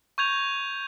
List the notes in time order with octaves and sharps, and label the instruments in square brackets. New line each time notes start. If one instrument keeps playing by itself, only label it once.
[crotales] C#6 G6 G#6 F7